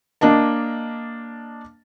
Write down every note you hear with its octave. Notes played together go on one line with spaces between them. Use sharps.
A#3 D4 D#5 A5